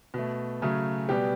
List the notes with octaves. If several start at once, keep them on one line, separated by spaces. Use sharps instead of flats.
B2 A3
C#3 F#3 A3
B2 G3 B3 G4